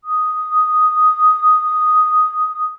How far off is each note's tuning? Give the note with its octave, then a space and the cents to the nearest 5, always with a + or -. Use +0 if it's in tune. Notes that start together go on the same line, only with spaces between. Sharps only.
D#6 +0